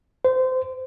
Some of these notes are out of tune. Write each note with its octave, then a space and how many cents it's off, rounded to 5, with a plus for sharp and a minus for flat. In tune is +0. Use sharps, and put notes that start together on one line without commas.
C5 -25